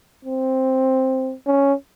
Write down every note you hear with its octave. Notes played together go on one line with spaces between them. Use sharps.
C4
C#4